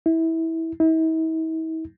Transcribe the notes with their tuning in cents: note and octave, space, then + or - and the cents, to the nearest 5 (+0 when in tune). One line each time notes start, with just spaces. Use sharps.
E4 -20
E4 -45